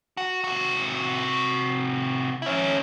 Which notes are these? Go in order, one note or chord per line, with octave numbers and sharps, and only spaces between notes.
F#4
C3 F#4
C#4 E4